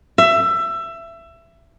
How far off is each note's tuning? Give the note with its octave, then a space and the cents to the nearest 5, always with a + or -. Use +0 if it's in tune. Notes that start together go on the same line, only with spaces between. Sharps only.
E5 +20